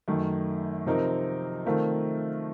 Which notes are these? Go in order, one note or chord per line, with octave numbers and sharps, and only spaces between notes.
F#2 D#3 A3
C3 F3 C4 D#4 A#4
D#3 A3 C4 F4 A#4